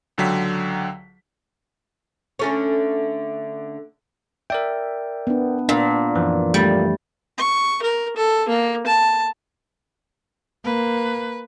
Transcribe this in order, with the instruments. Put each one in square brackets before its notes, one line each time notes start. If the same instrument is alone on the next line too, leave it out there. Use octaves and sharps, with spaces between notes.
[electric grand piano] C#2 D3 F#3 G5 B6
[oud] D3 A3 C#4
[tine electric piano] A#4 D5 G5 [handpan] E5
[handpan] B3 D4
[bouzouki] A#2 [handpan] D4
[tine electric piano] F#2 E3 F3
[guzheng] G3 [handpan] A3
[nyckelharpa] C#6
A#4
A4
A#3
A5
[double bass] A#3 [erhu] B4